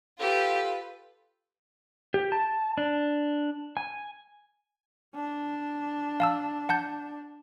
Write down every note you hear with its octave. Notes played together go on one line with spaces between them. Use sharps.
F4 G4 A4 B4
G4
A5
D4
G#5
D4
F5 A5 E6
F#5 A5 G6